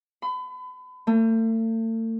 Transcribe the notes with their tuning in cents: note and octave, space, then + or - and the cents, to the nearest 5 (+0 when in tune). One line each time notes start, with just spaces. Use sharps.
B5 +35
A3 +40